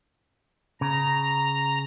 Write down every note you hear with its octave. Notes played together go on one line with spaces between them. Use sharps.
C#3 A#5